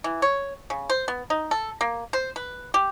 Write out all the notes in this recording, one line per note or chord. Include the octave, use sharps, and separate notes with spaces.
E3
C#5
C#3
C5
B3
D#4
A4
A#3
C5
B4
G4